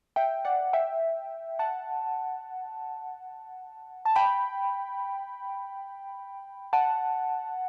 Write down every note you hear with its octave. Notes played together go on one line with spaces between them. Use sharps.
E5 G5
D5 F#5
E5 G5
F#5 A5
A5
G5 B5
F#5 A5